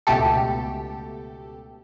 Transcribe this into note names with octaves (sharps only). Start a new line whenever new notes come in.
C#2 B2 A3 G4 A4